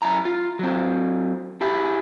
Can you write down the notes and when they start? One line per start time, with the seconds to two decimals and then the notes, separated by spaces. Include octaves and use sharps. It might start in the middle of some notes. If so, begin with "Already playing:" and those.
0.02 F#2 E4 A#5
0.25 F4
0.59 F#3 C4
1.61 E4 G4 G#4